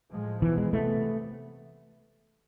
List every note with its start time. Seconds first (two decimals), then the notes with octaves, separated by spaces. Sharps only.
0.11 A2 F3 G#3
0.42 B2 E3 B3
0.57 G#3
0.73 C3 E3 A3 B3